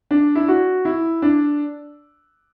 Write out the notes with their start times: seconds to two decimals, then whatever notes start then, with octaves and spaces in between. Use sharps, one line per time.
0.11 D4
0.35 E4
0.48 F#4
0.85 E4
1.22 D4